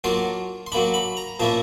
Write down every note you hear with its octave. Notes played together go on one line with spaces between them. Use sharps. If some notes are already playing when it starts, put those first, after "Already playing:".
F#3 A#3 D4 F4 C6
C6
F#3 A#3 D4 B5
B5
A#5
A#2 F3 A#3 C#4 E4 A5